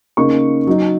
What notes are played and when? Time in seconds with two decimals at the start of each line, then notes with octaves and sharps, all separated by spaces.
0.17 C#3 A#3 D#4 C#6
0.67 F#3 D#4